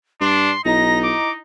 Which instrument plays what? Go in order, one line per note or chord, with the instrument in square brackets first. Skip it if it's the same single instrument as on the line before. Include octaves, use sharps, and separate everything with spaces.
[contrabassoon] G2 [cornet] D4 [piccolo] C6
[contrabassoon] B1 [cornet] D#4 [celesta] E4 D#5 A#5 [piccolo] A#6
[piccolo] D6